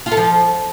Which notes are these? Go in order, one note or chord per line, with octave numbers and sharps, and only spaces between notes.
F4
A4
F3